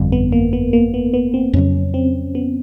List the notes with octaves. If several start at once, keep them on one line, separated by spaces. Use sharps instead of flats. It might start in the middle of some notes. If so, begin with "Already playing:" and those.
Already playing: G1 F2 D3 G3
B3
A#3
B3
A#3
B3
B3
C4
F2 C#3 F#3 C#4
C4
B3